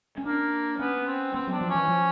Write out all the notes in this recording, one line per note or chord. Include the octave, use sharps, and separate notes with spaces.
C#4
A#3 D4
B3 C#4
C4
B3 C4
F#3
D4
F3
E3 C#4
F3